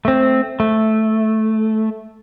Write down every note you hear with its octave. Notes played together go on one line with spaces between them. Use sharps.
A3 C4
A3